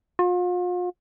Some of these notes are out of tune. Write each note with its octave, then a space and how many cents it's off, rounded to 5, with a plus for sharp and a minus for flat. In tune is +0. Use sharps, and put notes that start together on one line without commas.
F4 +40